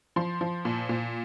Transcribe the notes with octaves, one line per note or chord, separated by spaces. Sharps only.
F3 C6
F3
A#2
A#2